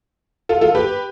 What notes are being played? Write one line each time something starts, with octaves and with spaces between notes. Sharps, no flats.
F4 A4
F4 A4
G4 B4